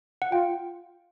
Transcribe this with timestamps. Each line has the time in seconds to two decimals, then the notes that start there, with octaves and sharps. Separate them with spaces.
0.22 F#5
0.32 F4 G5